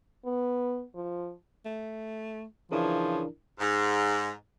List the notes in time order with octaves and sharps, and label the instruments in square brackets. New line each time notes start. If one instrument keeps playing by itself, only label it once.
[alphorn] B3
F3
[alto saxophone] A3
[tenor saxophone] C#3 [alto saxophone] E3 [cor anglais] F3 [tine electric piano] D4 E4 A#4
[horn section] G#2